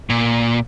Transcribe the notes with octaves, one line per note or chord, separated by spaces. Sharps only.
A#2